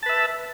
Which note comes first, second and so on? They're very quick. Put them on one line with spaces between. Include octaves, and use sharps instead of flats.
A5 B4 E5